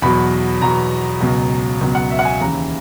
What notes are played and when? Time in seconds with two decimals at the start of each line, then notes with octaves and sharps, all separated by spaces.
0.02 E2 B2 F#3 B5
0.61 E2 B2 F#3 A#5
1.20 C#2 B2 F#3
1.81 C#2 B2 F#3
1.95 F#5
2.10 E5
2.19 F#5
2.25 G#5
2.40 D#2 C#3 E3 A#5